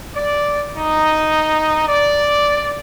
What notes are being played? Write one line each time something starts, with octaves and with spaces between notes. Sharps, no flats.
D5
D#4
D5